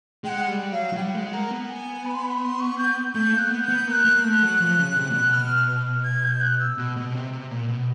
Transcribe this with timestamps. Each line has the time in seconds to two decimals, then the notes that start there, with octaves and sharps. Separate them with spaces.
0.24 G#3 G5
0.29 F#5
0.48 G3
0.72 F#3 F5
0.93 F#3
0.96 G3 G5
1.02 F#5
1.15 G#3
1.33 A#3
1.51 B3
1.70 G#5
2.05 B5
2.14 C6
2.22 B5
2.41 C6
2.61 C#6
2.78 G6
3.15 A3 G6
3.33 A#3
3.38 F#6
3.50 B3
3.64 B3 G6
3.87 A#3 G6
3.92 F#6
4.05 A#3
4.24 A3
4.42 F#3
4.60 F3
4.79 C#3
4.96 C3
5.10 A#2
5.15 B2
5.33 F6
5.57 F6
6.05 G#6
6.24 G6
6.41 F#6
6.60 E6
6.78 B2
6.97 B2
7.14 C3
7.33 C3
7.51 A#2
7.68 B2